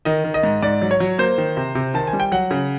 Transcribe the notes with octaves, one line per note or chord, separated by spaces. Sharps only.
D#3 D#5
D#3
D#5
G#2
G#2 D5
F#3
C#5
F#3
A#3 C5
D#3
C3
C3
D#3 A5
G#5
G3
G5
F#3 F#5
C#3